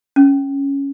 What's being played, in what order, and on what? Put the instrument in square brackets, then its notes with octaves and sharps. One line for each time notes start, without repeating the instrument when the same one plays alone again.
[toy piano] C#4